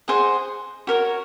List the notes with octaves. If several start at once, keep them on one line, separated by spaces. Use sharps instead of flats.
G#4 C5 D#5 F#5
F#4 A#4 C#5